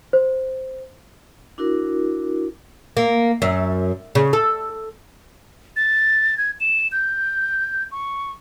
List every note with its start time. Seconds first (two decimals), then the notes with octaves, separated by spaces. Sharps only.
0.13 C5
1.58 D4 E4 F#4 A#4
2.97 A#3
3.42 F#2
4.15 C#3
4.33 A4
5.76 A6
6.38 G#6
6.60 E7
6.92 G6
7.92 C#6